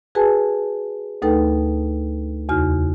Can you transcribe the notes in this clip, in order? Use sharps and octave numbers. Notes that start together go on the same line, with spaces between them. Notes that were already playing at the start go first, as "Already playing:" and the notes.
F#4 G#4 B4 G#5 A5
D2 A3 D#4 A4 B4 G5
E2 C#3 D#4 F#4 F6